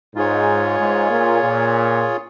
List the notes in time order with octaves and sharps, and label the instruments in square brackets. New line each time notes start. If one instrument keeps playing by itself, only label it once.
[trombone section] G#2 [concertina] F4 G#4 C#5
[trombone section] G#2
A#2
A#2